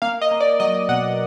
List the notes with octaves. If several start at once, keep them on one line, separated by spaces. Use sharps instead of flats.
A#3 F5
D#5
A#3
D5
F#3 D#5
B2 F#5